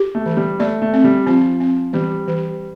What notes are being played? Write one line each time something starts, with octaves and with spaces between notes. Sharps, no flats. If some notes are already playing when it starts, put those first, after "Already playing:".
Already playing: G4
A3
E3
G3
A3 D5
A3
C4
G3
F3 C4
C4
E3 G3
E3